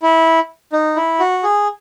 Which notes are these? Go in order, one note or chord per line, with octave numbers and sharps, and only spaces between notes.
E4
D#4
E4
F#4
G#4